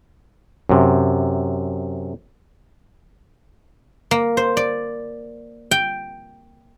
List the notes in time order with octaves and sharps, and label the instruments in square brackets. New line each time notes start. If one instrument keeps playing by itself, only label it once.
[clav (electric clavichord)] F#2 C3
[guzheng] A#3
C5
D5
G5